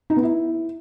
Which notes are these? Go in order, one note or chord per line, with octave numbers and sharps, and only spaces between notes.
D#4
B3
E4